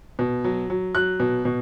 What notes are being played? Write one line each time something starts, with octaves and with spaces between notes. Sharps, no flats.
B2
F#3
F#3
F#3 F#6
B2
B2